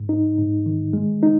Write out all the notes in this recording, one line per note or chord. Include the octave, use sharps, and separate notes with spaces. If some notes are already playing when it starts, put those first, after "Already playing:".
Already playing: G#2
D#4
G#2
D#3
G#3
D#4